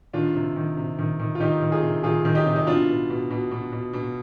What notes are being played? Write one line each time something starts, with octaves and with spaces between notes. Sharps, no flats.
D#3 D4 F4
C3
D#3
C3
D#3
D#3
F4
D#3 D#4 G4
D#3
F4 G#4
C3
D#3 F4 G#4
D#3
D#4 G4
C3
D#4
B2 D4 F4
B2
B2
B2
B2
B2
B2